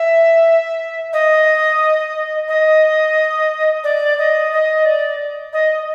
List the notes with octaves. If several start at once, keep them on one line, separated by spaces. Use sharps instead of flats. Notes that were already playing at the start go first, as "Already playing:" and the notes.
Already playing: E5
D#5
D#5
D5
D#5
D#5
D5
D#5